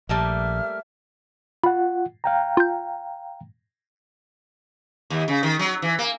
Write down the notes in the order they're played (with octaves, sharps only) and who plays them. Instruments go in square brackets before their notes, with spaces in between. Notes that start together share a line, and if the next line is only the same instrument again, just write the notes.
[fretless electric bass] A#1 [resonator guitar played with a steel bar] G3 A3 A#3 [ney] E5 [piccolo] F6
[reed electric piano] F4 F#5 [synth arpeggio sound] B5
[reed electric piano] F5 G5 A#5
[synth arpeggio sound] F4 G6
[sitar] D#2
C#3
D#3
F#3
E3
A#3